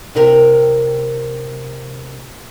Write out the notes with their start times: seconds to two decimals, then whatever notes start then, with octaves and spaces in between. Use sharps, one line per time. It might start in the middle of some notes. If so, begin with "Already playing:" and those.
0.15 C3 E4 A#4 G5